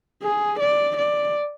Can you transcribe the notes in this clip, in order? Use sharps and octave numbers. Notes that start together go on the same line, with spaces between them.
G#4
D5
D5